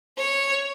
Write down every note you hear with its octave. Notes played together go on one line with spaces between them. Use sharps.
C#5